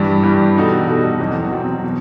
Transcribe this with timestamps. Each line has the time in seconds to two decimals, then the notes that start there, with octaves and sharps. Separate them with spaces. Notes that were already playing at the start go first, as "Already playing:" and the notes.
Already playing: G2 E3 G3
0.23 G2 E3 G3
0.55 B2 G3 D#4 F#4 A4
0.88 B2 G3 D#4 F#4 A4
1.20 E2 B2 F#3 C4
1.52 E2 B2 F#3 C4
1.84 B2